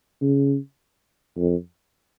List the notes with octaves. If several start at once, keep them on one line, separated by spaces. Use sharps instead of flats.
C#3
F2